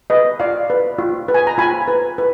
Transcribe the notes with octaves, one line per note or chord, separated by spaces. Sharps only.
B4 D#5
F4 D5 F5
B4
F4
B4
G#5
A#5
F4 G#5 B5
B4
B4